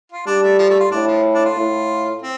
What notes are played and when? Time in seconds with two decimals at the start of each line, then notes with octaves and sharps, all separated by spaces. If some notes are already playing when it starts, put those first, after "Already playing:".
0.12 F4
0.27 G3 D4
0.43 A3
0.59 F3
0.70 A3
0.80 F4
0.91 A2 D4
1.07 F3
1.35 D4
1.45 F4
1.57 A2
2.22 C4